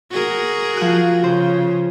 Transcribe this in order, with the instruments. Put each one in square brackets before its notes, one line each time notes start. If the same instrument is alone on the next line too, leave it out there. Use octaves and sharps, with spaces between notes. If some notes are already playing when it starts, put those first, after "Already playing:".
[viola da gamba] F#4 G#4 A#4
[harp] F3 F#6
[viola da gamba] C#3 [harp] C5